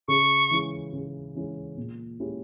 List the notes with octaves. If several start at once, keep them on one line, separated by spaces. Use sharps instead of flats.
C#3 C#6
E3 G#3 C#4 E4
C#3
E3 G#3 C#4 E4
A#2
G#3 C#4 E4 G4